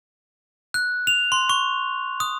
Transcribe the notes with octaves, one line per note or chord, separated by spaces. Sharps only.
F#6
F7
C6
C#6
D#6